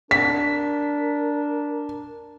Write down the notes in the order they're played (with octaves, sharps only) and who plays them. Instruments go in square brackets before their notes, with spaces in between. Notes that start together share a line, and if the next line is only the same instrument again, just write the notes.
[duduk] D4 [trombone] A#4 [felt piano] B6